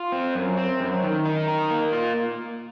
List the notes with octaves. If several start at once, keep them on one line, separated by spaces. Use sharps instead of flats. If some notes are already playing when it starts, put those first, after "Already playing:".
Already playing: F4
C4
F#2
C4
F#2
D#3
D#4
A#4
A#3
F4